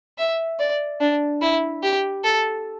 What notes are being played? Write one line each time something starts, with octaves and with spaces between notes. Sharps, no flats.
E5
D5
D4
E4
G4
A4